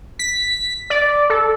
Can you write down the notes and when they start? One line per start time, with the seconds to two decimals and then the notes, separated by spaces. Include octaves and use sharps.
0.19 B6
0.90 D5
1.30 A4